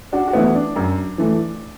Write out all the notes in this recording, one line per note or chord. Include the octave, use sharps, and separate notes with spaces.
D4 F#4
F#4
E3 A3 B3 E4
D4
F#2
E3 A3